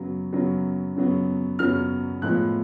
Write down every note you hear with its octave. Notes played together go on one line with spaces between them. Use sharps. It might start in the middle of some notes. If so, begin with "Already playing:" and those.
Already playing: F#2 C#3 F#3 B3
F#2 C#3 F#3 B3
F#2 C#3 F#3 B3
F#2 C#3 F#3 B3 F6
A2 F3 G#3 B3 F#6